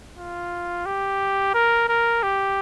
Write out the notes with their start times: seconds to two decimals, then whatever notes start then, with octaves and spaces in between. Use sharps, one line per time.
0.17 F4
0.86 G4
1.54 A#4
1.89 A#4
2.23 G4